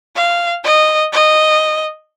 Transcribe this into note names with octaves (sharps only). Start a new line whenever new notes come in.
F5
D#5
D#5